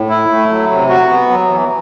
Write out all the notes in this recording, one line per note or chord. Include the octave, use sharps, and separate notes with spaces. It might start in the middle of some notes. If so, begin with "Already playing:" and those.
Already playing: A2
E4
A3
F#3
C3
F#4
B3
F#3
E3